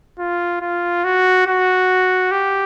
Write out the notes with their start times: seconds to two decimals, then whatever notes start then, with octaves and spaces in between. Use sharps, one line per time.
0.19 F4
0.61 F4
1.04 F#4
1.47 F#4
2.31 G4